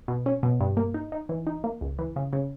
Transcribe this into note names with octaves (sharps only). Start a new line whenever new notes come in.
B2
C#4
B2
G2
A#3
D#4
D#4
E3
D#4
A#3
C#2
E3
C#3
C#3